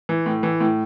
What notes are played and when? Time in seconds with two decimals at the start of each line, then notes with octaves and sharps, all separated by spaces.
0.09 E3
0.26 A2
0.43 E3
0.60 A2